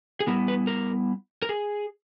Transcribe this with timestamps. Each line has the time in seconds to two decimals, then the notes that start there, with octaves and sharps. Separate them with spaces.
0.20 G#4
0.27 G3 B3 E4 A#4
0.48 B4
0.67 A#4
1.42 A#4
1.49 G#4